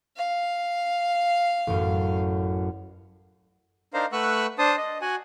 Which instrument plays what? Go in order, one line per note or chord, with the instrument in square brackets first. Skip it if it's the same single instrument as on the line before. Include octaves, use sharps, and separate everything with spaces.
[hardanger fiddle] F5
[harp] A1 F#2
[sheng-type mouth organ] D4 D#4 A#4 C5 F5
A3 B4 F#5 C#6 E6 F#6
D4 C5 A5 D#6
D#5
F#4 F#5 G#5